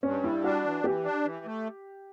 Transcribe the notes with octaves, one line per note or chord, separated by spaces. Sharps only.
G2 C#4
G3 E4
D4 F#4
E3
E3 G4
D4
E3
A3